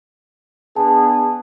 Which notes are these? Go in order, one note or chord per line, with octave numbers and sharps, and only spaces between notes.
B3 D4 G#4 G#5 A5